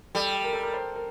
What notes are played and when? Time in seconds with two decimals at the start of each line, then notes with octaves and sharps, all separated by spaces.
0.15 G3 A4
0.44 A#4
0.53 A4
0.63 A#4
0.73 C5
0.96 A#4